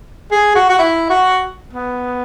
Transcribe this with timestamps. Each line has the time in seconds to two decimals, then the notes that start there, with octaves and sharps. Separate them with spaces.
0.32 G#4
0.55 F#4
0.69 F#4
0.79 E4
1.10 F#4
1.73 B3